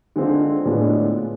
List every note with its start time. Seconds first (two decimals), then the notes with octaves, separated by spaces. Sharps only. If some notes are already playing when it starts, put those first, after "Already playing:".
0.16 D3 G#3 C4 F4
0.65 A2 G#3 B3 D4 F4